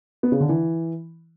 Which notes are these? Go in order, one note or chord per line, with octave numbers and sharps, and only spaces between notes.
B3
C#3
D3
E3